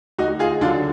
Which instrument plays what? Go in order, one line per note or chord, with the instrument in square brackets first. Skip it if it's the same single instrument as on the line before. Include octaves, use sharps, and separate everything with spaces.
[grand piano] D2 D#4 F#4
F4 G#4
D3 D4 F4
F#3